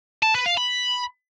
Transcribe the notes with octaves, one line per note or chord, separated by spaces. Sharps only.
A5
B4
F5
B5